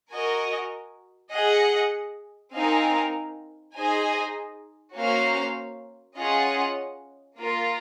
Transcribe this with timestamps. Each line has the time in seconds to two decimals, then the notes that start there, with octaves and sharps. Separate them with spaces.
0.13 F#4 A#4 D#5 G#5
1.34 G#4 D#5 F#5
2.55 C4 D#4 A#4 F5 G#5
3.77 D#4 G#4 C5 D#5 G#5
4.97 A#3 C#4 F#4 C5 F5
6.18 C#4 F4 G#4 D#5 F#5
7.40 A#3 F4 A#4